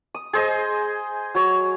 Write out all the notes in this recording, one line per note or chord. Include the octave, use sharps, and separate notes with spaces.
D#6
G#4 C5 D#5 D#6
F#3 C#5